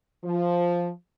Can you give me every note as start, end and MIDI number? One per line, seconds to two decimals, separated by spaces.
0.24 0.90 53